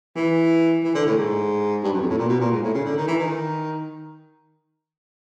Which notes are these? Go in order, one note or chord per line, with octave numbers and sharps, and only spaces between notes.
E3
E3
D3
A2
G#2
G2
F#2
F2
A2
A#2
B2
A#2
G#2
A2
C#3
D3
D#3
E3
D#3